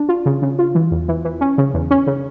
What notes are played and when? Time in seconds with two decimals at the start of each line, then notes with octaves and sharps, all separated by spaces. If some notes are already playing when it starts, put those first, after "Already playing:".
Already playing: D4
0.09 F4
0.26 C#3
0.42 C#3
0.59 F4
0.75 E3
0.91 E2
1.08 E3
1.25 E3
1.41 C#4
1.58 C#3
1.74 E2
1.91 C#4
2.07 C#3